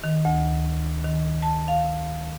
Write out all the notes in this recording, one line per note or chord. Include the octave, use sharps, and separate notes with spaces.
D#3
D2
D#3
A5
F5